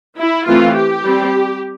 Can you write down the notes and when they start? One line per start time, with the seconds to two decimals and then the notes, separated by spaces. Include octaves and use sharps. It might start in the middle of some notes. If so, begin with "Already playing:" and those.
0.18 E4
0.46 E3 A3 C4 F4
0.75 G4
1.03 G3 C4